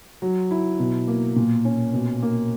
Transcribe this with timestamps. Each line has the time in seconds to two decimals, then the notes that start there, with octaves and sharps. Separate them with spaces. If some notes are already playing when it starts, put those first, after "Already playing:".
0.22 F#3
0.51 E4
0.79 B2
1.08 A#3
1.36 A#2
1.65 C#4
1.94 B2
2.22 A#3